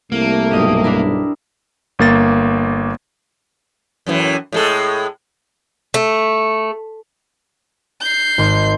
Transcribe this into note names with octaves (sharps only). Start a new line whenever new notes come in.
C2 A3 A#3
B1 G2 G4 D#5 D#6
D4 E4 A#4
G1 A#3 A6
F#2 A2 E3
A2 G#3 A4
A3
G6 C7
G#1 C6